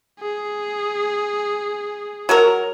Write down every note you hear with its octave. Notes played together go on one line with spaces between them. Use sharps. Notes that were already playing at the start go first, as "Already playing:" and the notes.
G#4
F#3 F#4 A#4